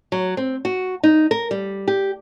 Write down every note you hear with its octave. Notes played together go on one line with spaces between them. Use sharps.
F#3
C4
F#4
D#4
A#4
G3
G4